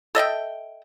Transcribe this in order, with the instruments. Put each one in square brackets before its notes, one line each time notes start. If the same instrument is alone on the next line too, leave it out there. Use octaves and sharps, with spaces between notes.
[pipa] A4 D#5 E5 G5